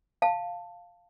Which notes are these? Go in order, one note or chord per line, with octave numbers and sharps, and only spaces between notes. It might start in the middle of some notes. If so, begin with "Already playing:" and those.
F5 A5